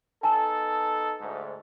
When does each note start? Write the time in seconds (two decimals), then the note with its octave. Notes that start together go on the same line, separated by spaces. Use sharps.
0.23 B3 D#4 A4 G#5 A5
1.20 D2 G#2